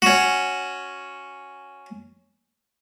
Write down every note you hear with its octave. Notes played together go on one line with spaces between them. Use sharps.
C#4 F#4